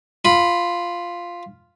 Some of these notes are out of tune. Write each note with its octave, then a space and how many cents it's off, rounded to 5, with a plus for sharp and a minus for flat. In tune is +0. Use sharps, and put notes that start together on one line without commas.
F4 -5 B5 +0